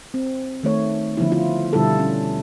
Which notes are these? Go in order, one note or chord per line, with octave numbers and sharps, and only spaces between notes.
C4
D#3 A3 C#5
D3 F3 B3 E4
E4 F4
B2 D3 G3 E4 F4 A4
D3 C#4